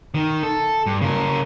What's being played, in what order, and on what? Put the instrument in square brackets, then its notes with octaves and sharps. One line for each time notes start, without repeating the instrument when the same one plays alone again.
[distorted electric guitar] D#3
A4
G2
C#3 A#4